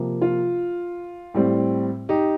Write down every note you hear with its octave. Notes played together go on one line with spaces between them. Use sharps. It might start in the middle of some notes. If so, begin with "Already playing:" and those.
Already playing: C3 F3 A#3
F4
A2 G3 C4
D#4 G4